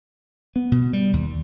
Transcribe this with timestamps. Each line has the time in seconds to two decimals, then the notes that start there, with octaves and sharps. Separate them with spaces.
0.56 B3
0.72 B2
0.93 G3
1.13 D#2